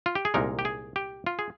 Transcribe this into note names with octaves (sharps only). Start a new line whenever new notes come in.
F4
G4
G#4
C2 A#2 G#3 D#4 A#4
G4
G#4
G4
F4
G#4